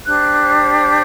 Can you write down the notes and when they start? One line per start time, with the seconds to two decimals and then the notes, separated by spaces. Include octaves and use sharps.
0.06 D4 G4 C5 F#6
0.81 G6